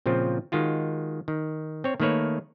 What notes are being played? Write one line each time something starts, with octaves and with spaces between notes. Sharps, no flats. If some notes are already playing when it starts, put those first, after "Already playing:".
A#2 C#3 F3 C4 F4
D#3 G#3 F4 F#4
D#3
C4 C#5
D#3 A3 A#3 B4 C#5